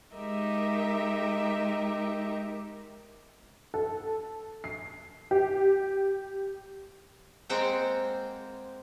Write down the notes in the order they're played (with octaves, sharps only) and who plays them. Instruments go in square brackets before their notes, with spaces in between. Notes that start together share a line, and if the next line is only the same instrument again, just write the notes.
[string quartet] G#3 D#4 G4 A#4 D#5 E5
[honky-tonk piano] A4
C7
G4
[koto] G#3 A#3 C4 C5 F#5 G5